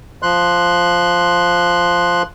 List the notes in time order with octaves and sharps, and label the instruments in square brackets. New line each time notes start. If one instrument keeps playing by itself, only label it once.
[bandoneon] F3 C6 F#6